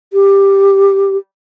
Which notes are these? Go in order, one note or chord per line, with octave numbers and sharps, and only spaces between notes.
G4